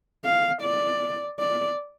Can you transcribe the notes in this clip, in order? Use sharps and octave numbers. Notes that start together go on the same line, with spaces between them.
F5
D5
D5